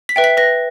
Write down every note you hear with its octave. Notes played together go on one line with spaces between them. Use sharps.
B6
B4 E5 G5
B6
B4 A#6